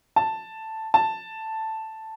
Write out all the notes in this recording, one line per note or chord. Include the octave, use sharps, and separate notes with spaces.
A5
A5